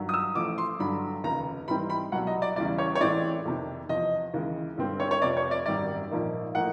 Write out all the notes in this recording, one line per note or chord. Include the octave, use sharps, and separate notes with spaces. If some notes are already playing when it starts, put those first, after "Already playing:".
Already playing: G2 D#3 F#3
D#6
E6
A1 A2 F3 D6
C6
G2 D3 F#3 B5
F1 D#2 C#3 A#5
G#2 E3 G3 C4 B5
B5
C2 B2 F#3 F#5
D#5
D5
E2 C#3 E3 G3 D5
C#5
C#5
A1 A2 E3 G#3 C4 D5
F2 C3 D#3
E2 C3 F3 D#5
D#2 C#3 E3 G#3
G2 D3 G3 C4
C#5
C#5
F1 F2 C3 D5
C#5
D5
G#1 F#2 D#3 G3 D5
A#1 G#2 F3 A#3 D#4
A2 F3 A#3 D#4 F#5